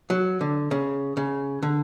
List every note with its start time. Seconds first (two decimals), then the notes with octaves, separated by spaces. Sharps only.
0.10 F#3
0.41 D3
0.71 C#3
1.17 C#3
1.63 D3